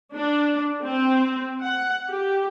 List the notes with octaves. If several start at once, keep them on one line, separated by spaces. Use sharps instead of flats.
D4
C4
F#5
G4